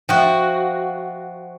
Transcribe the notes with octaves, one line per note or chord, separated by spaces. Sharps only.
F3 F#4 E5 G5